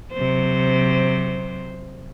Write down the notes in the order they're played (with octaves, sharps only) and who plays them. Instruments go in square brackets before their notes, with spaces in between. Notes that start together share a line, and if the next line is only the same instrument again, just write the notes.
[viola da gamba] C3 F#3 C5